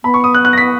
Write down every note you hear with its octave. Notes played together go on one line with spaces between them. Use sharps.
B3 B5
C#6
D#6
F#6
F#6
A#6
B6